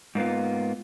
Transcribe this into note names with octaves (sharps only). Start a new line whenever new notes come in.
G#2 A#3 B3 F4